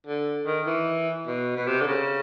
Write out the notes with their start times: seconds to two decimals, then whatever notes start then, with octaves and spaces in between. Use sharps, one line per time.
0.07 D3
0.47 D#3
0.67 E3
1.27 B2
1.56 B2
1.67 C3
1.81 D3
1.87 C#3